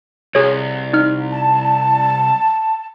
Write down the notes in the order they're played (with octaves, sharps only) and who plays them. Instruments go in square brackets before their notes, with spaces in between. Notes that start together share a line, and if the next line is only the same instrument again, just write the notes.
[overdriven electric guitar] C2 [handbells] G#4 C#5
[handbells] D#4 F6
[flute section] A5